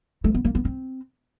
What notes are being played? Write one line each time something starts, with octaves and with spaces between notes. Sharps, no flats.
A3
B3
A#3
B3
C4